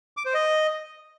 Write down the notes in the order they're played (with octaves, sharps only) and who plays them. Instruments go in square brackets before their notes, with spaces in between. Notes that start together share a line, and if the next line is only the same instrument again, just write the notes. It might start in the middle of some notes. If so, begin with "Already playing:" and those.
[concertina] D6
C5
D#5